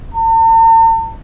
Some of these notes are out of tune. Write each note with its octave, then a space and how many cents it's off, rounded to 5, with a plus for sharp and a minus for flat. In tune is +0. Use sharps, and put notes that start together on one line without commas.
A5 +45